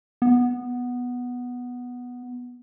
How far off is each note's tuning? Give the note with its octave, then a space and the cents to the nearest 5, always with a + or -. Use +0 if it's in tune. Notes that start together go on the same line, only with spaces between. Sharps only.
B3 -5